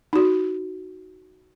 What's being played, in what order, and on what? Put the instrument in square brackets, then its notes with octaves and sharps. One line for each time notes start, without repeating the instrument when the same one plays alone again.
[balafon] D#4 F#4